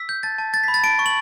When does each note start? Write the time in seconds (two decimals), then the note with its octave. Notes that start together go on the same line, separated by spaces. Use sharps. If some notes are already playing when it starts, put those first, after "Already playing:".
Already playing: E6 B6
0.09 G6
0.23 A5 A6
0.38 A5
0.53 G6 A6
0.64 B5 B6
0.74 A6
0.83 A5 D7
0.99 C#6
1.06 F#7